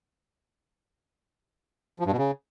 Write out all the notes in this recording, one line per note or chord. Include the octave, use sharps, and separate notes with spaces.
F3
G2
B2
C#3